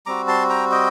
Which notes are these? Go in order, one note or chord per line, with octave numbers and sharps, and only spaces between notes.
G3 C4 F#4 A#5 D6
A5 C6
G5 A#5
D#5 G5